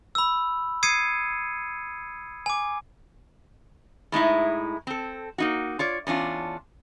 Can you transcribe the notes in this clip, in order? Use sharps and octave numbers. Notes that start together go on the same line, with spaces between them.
B5 E6
D#6 G#6 C7 C#7 D#7
G#5 D6
A2 G#3 D#4 E4
C4 A4
A#3 D#4 F#4
F4 C#5 D5
E2 C#4 D4 F4